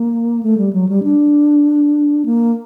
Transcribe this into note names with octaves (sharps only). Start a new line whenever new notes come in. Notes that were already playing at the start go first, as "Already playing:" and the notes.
Already playing: A#3
A3
G3
F#3
G3
D4
A#3